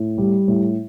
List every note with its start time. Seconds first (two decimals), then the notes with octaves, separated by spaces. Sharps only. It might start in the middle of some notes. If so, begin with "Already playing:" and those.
Already playing: A2
0.18 G3
0.48 A2